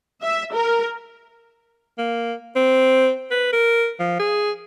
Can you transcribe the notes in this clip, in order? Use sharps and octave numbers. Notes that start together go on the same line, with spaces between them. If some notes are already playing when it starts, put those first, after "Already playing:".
E5
A#4
A#3
C4
B4
A#4
F3
G#4